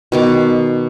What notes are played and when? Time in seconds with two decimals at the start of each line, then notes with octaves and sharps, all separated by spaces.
0.12 B2 D#3 D6